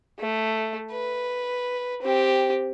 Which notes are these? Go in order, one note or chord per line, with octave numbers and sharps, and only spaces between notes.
A3
B4
C4 G4